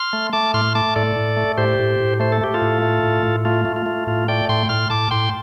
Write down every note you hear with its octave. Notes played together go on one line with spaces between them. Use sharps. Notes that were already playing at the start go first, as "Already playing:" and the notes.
Already playing: C6 F6
A3
A3 A5 D6
A2 C6 F6
A3 A5 D6
A2 A4 D5
A2
A3
A2 G4 C5
A2
A2
A3 C5
A4
A3 G4
F4 A4
A2
A3
A2
A2
A3 F4
A3
F4
A3
A2 F4
A3 D5 G5
A2 G5 C6
A2 C6 F6
A2 A5 D6
A2 G5 C6